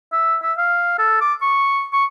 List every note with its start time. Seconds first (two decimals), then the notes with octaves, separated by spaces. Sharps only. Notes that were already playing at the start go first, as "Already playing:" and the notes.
0.12 E5
0.43 E5
0.58 F5
0.99 A4
1.21 D6
1.42 C#6
1.93 C#6